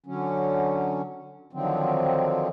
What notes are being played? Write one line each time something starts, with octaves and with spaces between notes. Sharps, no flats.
D3 F#3 C#4
D3 D#3 F3 F#3 C4